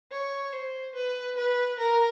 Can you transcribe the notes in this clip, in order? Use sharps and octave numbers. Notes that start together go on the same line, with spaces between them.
C#5
C5
B4
B4
A#4